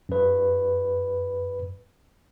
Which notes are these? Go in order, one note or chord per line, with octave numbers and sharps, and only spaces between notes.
F#2 B4